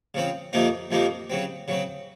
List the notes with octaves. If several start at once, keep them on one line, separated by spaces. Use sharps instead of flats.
C#3 F3 C4
F2 C3 F3 A#3 D#4
F2 C3 F3 A#3 D#4
C#3 F#3 C4
C#3 F#3 C4